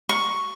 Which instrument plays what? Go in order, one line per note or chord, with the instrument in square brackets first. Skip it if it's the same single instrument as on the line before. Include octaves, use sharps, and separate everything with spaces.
[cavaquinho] C#6